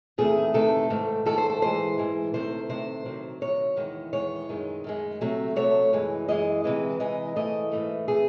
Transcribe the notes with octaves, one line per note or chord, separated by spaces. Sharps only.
E2 C3 D#3 A3 G#4
E2 C3 D#3 A3 A4
G#2 D#3 A3
G#2 D#3 A3 A4
C5
A4
G#2 E3 G#3 C5
G#2 E3 G#3
C3 D#3 A3 C5
C3 D#3 A3 C5
C3 D#3 F#3
C3 D#3 F#3 C#5
E2 D#3 G#3
E2 D#3 G#3 C#5
F#2 D#3 G#3
F#2 D#3 G#3
C3 F#3 A3
C3 F#3 A3 C#5
F#2 E3 G#3
F#2 E3 G#3 D#5
C3 E3 G#3
C3 E3 G#3 D#5
G#2 E3 A3 D#5
G#2 E3 A3
C3 E3 A3 G#4